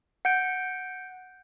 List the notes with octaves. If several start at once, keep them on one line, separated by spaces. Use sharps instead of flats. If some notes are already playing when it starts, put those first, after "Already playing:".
F#5 G6 D7